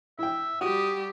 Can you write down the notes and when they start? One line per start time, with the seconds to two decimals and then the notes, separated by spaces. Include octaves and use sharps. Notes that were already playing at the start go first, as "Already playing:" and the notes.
0.19 E4 E5 G5
0.61 G3 F#4 G4 D#6